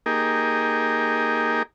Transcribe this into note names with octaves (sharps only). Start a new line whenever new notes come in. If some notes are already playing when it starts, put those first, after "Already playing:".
A#3 D#4 G4 G#4 A#4